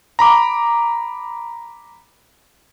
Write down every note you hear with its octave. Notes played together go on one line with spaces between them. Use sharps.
A#5 B5 D6